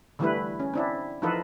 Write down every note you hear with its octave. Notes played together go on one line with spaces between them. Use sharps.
D3 E3 G3 A3 E4 B4
C#4
C4 D4 E4
E3 F3 D#4 F4 A4 B4